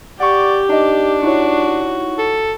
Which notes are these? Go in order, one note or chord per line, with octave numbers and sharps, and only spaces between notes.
G4 D5 F#5 C#6
D4 D#4 D#5
D#4 E4 F#4 C#5
A4